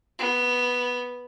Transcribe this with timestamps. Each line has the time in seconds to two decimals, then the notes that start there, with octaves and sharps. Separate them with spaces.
0.19 B3